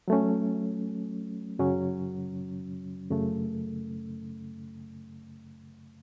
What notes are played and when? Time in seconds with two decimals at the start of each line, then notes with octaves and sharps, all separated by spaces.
0.08 F#3 A3 C#4
1.59 F#2 C#3 F#3 C#4
3.11 F#2 C#3 A3